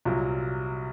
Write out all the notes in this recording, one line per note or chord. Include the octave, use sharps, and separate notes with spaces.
C2 A#2 F#3